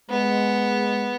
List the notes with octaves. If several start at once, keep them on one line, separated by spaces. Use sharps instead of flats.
G#3 B3